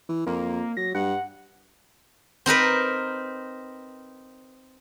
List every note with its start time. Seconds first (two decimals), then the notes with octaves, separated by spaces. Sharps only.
0.09 E3
0.26 F2 A#3
0.77 F#3 A#6
0.95 G2 F#5
2.46 C4 D#4 A#4 B4